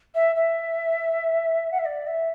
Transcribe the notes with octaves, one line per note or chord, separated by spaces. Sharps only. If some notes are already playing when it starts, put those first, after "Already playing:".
E5
E5
F#5
E5
D5
E5